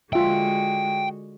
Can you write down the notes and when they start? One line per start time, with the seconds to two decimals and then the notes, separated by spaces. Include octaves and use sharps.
0.13 D3 G#3 F4 F#4 E5 G5